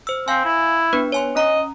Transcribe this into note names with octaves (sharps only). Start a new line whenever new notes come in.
C5 E6
C4 F5 G#5
E4
B3 D4 B4
C#5 G#5 C6
C#4 D#5 A#5